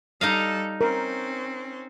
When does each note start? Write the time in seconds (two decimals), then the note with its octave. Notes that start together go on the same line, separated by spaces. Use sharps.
0.21 G3 D#4 A4 D#5 F5
0.81 C4 C#4 A#4